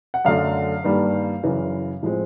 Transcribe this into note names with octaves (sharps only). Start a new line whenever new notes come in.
F#5
F#2 D3 F#3 A3 F5
G2 D#3 G3 A#3
F#2 C#3 E3
A2 F3 G#3 C4